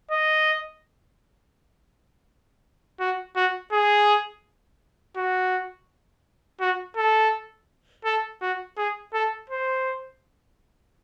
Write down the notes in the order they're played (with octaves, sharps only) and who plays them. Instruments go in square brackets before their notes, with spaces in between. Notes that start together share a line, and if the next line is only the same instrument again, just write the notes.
[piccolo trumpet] D#5
F#4
F#4
G#4
F#4
F#4
A4
A4
F#4
G#4
A4
C5